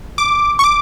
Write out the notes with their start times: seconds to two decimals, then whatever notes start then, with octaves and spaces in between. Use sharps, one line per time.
0.18 D6
0.59 C#6
0.64 D6